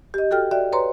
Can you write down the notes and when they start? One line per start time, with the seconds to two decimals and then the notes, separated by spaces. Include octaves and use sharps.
0.14 G4 D#5
0.31 F#4 A4 G5 F6
0.51 F#4 D5 E5 G5
0.73 B4 C#5 A#5 C6